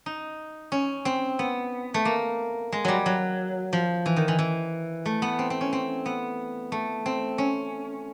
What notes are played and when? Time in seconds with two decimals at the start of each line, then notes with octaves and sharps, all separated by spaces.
0.06 D#4
0.72 C#4
1.05 C4
1.39 B3
1.94 A3
2.05 A#3
2.72 G#3
2.85 F#3 G3
3.06 F#3
3.73 F3
4.06 E3
4.16 D#3
4.28 E3
4.39 E3
5.06 A3
5.22 B3
5.39 C4
5.50 C4
5.61 C#4
5.73 C4
6.06 B3
6.72 A3
7.06 C4
7.38 C#4